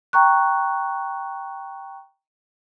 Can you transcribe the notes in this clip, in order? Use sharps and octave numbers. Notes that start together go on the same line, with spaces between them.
G5 A#5 C#6 F#6